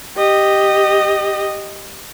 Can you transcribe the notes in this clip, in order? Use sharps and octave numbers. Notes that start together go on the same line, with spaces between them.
G4 D#5